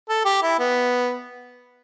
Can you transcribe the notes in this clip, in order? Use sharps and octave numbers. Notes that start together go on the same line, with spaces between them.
A4
G4
E4
B3